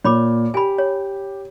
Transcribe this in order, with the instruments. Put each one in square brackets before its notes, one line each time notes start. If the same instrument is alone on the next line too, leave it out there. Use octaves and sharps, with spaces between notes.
[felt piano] A#2 [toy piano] C#5 B5 D6
[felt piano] G4 [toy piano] G#5 B5
[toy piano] C#5